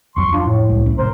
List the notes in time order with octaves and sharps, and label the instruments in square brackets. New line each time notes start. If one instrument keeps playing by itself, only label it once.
[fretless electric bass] D1 F2 F#3 [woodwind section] C6 C#6
[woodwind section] D4 F4
A2
[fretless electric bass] C2 G#3
B1 A3 C#4
[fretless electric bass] F1 A2 C3 [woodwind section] A#4 C5